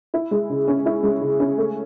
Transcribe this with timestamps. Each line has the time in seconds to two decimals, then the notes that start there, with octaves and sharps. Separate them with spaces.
0.14 E4
0.31 G#3
0.50 C#3
0.68 C#4
0.86 E4
1.03 G#3
1.21 C#3
1.40 C#4
1.58 A3